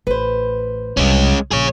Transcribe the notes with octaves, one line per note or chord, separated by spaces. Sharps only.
A1 B4 C5
C2 F2 G#3 C#4
A#1 G#4 C#5